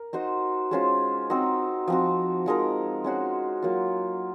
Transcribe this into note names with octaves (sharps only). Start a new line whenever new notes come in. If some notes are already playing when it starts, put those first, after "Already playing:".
Already playing: A#4
D#4 F#4 C5 D#5
G#3 C#4 F4 C5
C4 D#4 F#4
F3 C4 F#4
F3 G#3 D#4 A#4
G#3 C#4 F#4 C5
F#3 A#3 F4